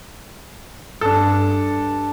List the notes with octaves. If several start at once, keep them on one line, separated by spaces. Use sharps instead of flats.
G2 D4 A4